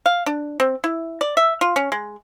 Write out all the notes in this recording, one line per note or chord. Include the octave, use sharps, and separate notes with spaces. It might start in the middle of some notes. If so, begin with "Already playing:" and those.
F5
D4
C4
E4
D5
E5
F4
C#4
G#3